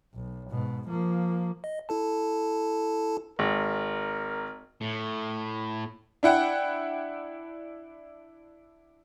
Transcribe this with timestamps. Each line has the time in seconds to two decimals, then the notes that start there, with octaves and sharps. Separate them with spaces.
0.14 B1
0.50 G#2 B2
0.89 F3 A#3
1.64 D#5
1.89 E4 A4 A5
3.39 G#1 A#4
4.81 A2
6.23 D4 E4 F#5 G5